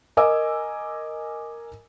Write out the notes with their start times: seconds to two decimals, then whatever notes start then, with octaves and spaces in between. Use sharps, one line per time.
0.17 A#4 D#5 G#5 D6 E6